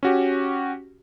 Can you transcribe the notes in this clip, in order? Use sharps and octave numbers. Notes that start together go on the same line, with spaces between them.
C#4 F#4 G4